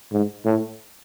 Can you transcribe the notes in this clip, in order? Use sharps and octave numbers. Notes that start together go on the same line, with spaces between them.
G#2
A2